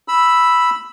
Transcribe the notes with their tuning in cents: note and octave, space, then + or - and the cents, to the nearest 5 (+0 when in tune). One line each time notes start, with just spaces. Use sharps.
B5 +0 E6 +0